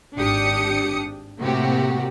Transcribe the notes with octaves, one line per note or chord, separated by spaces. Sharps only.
G#1 D4 G4 D#6 C#7
A2 C3 A#3 F#4 G4